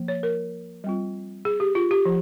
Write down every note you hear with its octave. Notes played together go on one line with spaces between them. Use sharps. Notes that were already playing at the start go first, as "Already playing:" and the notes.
Already playing: F3 A#3
C#5
A#4
G3 C4 F4
G#4
G4
F4
G4
F3